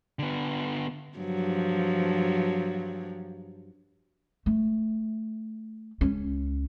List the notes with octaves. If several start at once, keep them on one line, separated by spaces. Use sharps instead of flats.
D3 B3
G2 F3 F#3
A3
C#2 C#4